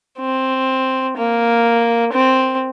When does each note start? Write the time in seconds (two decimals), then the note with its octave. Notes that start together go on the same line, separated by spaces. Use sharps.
0.19 C4
1.17 A#3
2.13 C4